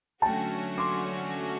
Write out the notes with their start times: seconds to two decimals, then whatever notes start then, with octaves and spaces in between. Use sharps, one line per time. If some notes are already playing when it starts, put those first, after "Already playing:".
0.22 D3 F#3 A3 C#4 F#4 G5 A5
0.78 C6 D6